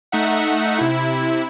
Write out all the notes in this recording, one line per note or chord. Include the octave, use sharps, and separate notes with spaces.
A3 D#4 E5 F#5
C3 E4